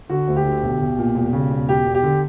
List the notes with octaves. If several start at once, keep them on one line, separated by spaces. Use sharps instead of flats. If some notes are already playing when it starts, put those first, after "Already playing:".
D3 F#4
D2
G4
D3
B1
B1
A#2
E1
C#3
E1
E1 G4
E1
G4
D3